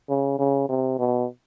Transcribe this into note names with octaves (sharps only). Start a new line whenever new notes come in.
C#3
C#3
C3
B2